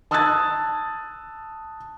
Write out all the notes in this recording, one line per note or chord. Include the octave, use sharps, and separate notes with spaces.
A5 D#6 E6 F#6 G#6 A6